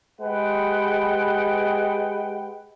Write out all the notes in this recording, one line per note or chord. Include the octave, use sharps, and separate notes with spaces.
G#3 G4 B4 F#5 G5